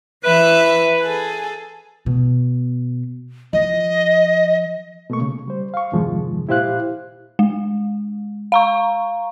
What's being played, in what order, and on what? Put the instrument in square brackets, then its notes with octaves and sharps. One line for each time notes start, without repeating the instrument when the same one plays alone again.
[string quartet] E3 E5 F#6 [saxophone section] B4
[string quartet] G#4 A4
[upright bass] B2
[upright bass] F3 [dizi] D#5
[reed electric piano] B2 A3 A#3 C#6
C#3
G3 C5
F5 C#6
E2 G2 C3 D#3 F3 G#3
A#2 E4 G4 C5 F5 F#6
[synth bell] G#3
F5 A#5 C#6